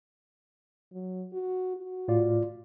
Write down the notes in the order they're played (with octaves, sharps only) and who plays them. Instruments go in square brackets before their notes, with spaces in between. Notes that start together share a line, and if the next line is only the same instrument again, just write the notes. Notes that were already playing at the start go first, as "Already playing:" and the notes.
[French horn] F#3
F#4
F#4
[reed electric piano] A2 F4 D5